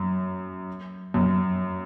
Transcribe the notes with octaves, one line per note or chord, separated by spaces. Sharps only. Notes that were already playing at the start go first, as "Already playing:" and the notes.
Already playing: F#2
F#2